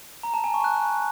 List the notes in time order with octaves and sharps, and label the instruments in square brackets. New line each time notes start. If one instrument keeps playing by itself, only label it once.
[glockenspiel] A#5
A5
G#5
C#6
F#6